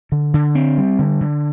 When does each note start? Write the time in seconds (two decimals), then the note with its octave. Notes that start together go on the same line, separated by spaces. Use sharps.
0.12 D3
0.34 D3
0.55 C4
0.78 G3
0.99 D3
1.21 D3